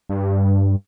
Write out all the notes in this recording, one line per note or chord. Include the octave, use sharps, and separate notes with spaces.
G2